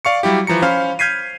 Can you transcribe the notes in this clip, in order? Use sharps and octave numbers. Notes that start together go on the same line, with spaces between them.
D5 F5 C#6 C#7
F#3 G3 E4 G4
E3 F3 A#5 C#7
C#4 C5 F5 B5 F6
F6 G6 G#6 B6 C7 D#7